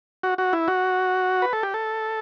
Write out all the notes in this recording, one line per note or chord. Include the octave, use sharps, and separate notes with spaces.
F#4
F#4
E4
F#4
B4
A4
G4
A4